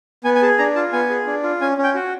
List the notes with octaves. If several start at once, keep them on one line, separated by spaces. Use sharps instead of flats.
B3 G#5
G#5
G#4 A5
D4 A#5
F4 A5
B3 G#5
G#4
D4
F4
C#4 G#5
C#4
G5
F#4